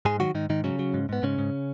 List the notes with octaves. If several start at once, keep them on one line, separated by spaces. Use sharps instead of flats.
G#2 G#3 G#4
D#3 F#3 F#4
G#2 D#3 D#4
G#2 D#3 D#4
C#3 F#3 C#4
F#3
G#2
G#2 B3
G#2 C#3 C#4
G#2